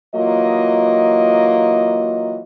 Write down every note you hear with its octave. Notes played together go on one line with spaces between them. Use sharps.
E3 F#3 A#3 F4 D#5